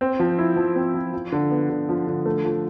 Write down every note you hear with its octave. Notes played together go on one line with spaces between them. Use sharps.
C4
F3
E4
F3
C4
F3
F3
D3
B3
D3
F3
D3
A3
F3